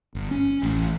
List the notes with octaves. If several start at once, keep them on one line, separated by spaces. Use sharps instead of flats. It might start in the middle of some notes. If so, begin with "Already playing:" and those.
G1
C#4
A1